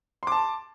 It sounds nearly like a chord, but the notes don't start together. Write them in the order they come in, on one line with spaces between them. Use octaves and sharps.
C6 D6 A5